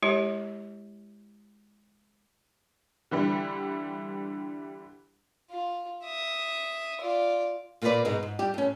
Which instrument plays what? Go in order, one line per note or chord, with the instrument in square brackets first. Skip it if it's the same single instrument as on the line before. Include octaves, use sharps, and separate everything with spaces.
[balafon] G#3 E4 G4 C#5
[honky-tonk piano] D3 E3 G3
[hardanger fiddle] F4
E5 D#6
F4 D5
[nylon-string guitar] A#2 A#3 F4 A4 B4 D5
G#2 B2 G#3 D#4
G#2
G3 G4
A2 C#4